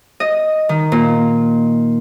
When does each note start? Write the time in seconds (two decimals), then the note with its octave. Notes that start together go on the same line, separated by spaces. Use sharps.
0.20 D#5
0.69 D#3
0.92 A#2